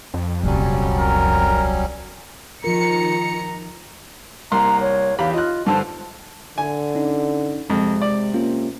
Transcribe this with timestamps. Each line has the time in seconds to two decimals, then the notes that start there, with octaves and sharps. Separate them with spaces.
0.14 F2
0.43 D#1 C2 F#3 G3 C#4
1.00 A#4
2.64 D#3 F3 F4 A#4 A#5 C#7
4.52 C2 A#3 A#5 C6
4.81 C#5
5.19 E2 G4 F5 B5
5.34 F4 D#5 F#6
5.66 G2 D3 C5 A5
6.58 D3 G#5
6.95 C#4 D#4
7.70 F2 C3 G#3
8.02 D5
8.34 A#3 C#4 F4